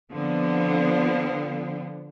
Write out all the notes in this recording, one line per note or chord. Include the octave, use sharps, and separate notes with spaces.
D3 F3 B3 C4